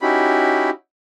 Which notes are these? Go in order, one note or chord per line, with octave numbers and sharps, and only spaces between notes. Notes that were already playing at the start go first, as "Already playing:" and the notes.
C#4 D#4 E4 F#4 G4 B5